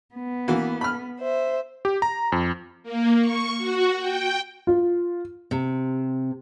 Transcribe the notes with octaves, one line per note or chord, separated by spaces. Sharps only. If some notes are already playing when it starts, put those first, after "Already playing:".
B3
E3 A#3 F#4
B5 F6
C5 E5
G4
A#5
F2
A#3
C#6
F#4
G5
F4
C3